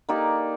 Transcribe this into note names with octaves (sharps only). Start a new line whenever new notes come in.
A#3 D#4 G4 D5